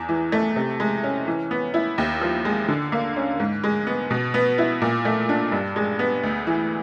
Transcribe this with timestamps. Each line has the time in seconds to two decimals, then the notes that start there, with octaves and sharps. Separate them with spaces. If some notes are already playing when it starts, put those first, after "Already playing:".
Already playing: E2
0.09 E3
0.32 A3
0.56 C3
0.80 G#3
1.04 C#4
1.27 E3
1.51 B3
1.74 E4
1.98 D#2
2.21 F3
2.45 G#3
2.68 D3
2.92 A#3
3.16 C#4
3.40 G#2
3.64 G#3
3.87 B3
4.10 B2
4.34 B3
4.58 E4
4.82 A#2
5.05 A3
5.29 D4
5.52 G2
5.76 G#3
5.99 B3
6.23 D2
6.47 E3